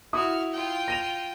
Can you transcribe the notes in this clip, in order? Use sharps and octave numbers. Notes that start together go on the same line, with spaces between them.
E4 F#4 D#6 F6
F4 G5
A#6 D#7 F7